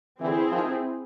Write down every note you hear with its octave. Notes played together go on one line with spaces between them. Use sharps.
D3 E3 C4 E4 G#4
D#3 F3